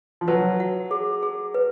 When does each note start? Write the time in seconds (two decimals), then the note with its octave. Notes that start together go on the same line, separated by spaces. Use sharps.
0.21 F3
0.28 F#3 B4
0.60 F#5
0.91 G#4
1.23 G#4
1.54 B4